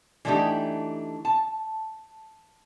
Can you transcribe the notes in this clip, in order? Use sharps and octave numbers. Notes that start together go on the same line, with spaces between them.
E3 A3 D4 D#4 G4
A5